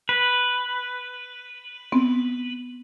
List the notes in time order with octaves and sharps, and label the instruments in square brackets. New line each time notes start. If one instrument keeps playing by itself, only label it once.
[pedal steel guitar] B4
[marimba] B3 C4